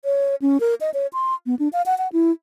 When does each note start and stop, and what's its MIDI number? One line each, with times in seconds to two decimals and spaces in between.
0.05 0.35 73
0.42 0.60 61
0.60 0.75 70
0.81 0.90 75
0.94 1.07 73
1.13 1.34 84
1.46 1.55 59
1.59 1.68 62
1.73 1.82 77
1.86 1.97 78
1.98 2.08 78
2.13 2.31 64